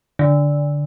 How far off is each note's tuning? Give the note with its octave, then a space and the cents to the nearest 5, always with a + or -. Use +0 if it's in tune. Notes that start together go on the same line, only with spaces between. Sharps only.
D3 -10